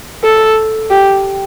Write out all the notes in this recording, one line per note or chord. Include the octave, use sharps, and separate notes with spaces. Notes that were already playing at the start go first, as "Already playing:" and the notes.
A4
G4